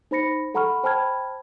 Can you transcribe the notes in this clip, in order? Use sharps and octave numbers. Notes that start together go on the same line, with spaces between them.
D#4 C5 B5 A#6 C#7
A4 F#5 A#5 B5 C#6 F6
C5 G5 A5 B5 F6 G#6